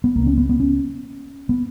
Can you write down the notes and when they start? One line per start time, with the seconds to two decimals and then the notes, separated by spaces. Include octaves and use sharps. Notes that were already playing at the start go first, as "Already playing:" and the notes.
0.04 B3
0.15 C#2 C#3 A#3
0.27 C#4
0.38 B3
0.49 B3
0.60 C#4
1.49 B3